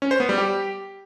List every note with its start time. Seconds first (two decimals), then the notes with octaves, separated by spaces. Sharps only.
0.02 C#4
0.11 C5
0.20 B3
0.29 G3
0.38 G4